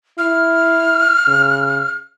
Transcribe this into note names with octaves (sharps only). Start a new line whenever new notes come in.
E4 F6
C#3